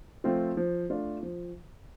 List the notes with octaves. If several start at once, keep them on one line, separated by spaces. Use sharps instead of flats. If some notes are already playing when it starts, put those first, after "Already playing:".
F3 A3 C4 F4
F3
A3 D4 F4
F3